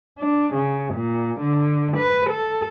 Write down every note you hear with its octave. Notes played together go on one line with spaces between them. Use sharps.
D4
C#3
A#2
D3
B4
A4